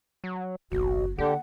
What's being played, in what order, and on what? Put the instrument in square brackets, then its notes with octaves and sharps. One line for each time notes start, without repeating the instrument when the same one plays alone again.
[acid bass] F#3
[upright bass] F#1 [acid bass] B1 [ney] F#4
[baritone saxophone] D3 [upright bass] A#3 [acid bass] G4 [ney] F#5